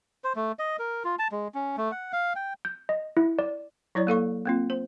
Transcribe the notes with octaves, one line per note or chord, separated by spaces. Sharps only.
C5
A3
D#5
A#4
F4
A5
G#3
C#4
A3
F#5
F5
G5
G6
D#5
E4
D5
F#3 E4 C#5 D5
A#3 A4 F5 C#6
A#3 C4 F4
C5